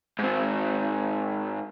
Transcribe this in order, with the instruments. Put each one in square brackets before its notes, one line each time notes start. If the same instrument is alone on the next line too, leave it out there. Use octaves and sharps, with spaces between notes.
[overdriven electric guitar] G#2 C4